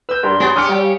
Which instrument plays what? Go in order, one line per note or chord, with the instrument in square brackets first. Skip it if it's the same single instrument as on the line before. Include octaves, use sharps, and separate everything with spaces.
[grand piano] B4 G6 [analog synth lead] E6
[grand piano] G2 A#4 [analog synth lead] G3 [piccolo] C6
[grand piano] F#3 G#4 C#5 [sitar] B3
[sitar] C#4 G4 [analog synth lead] D4 [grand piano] D#6 F6 C#7
[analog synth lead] G3
[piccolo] F5